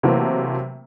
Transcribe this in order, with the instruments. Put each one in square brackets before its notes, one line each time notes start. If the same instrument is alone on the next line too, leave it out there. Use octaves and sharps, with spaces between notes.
[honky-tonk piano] C3 E3 F#3 A3 A#3 C4